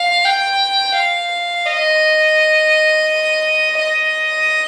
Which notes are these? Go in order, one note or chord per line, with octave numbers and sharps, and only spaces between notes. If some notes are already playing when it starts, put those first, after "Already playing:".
Already playing: F5
G5
F5
D#5
D#5